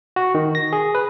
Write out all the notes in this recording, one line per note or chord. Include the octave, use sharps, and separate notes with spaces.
F#4
D#3
A#6
G#4
B4